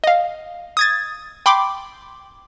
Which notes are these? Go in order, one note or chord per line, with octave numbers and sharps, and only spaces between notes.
D#5 F5
D#6 G#6 A6
G5 B5 C6 D6